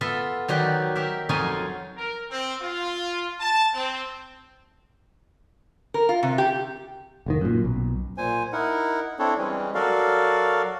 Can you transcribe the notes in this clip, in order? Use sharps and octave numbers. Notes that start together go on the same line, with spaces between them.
B3 F4 A4 E5
D#3 F#3 F#4 G4 D5
G4 A#4 E5
F2 F#3 D#4 F4 C#5 G#5
A#4
C4
F4
A5
C4
A#4
F4
C3
G4
F1 C3 D#3
F#2 A#2
B1
A#2 C5 G#5
D#4 E4 A#4 F#5
C4 D4 E4 A4 C#5
E3 G3 G#3 C4 C#4
F#3 F#4 A4 A#4 D5 F5